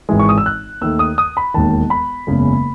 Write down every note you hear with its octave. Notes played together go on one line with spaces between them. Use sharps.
G#1 G#2 E3 G#3
C#6
D#6
E6
F#6
D#2 D#3 A3 E6
D#6
D#6
B5
E1 D#2 D#3 A5
B5
F#1 E2 C#3 G#3